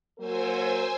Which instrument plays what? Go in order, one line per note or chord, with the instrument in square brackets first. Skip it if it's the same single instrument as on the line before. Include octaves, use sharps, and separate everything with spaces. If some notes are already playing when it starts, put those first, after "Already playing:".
[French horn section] F#3 A#3 A#4 [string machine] C5 G#5 E6